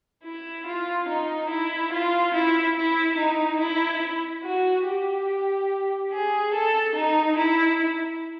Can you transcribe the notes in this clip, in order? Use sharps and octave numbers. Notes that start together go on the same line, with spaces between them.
E4
F4
D#4
E4
F4
E4
E4
D#4
E4
F#4
G4
G#4
A4
D#4
E4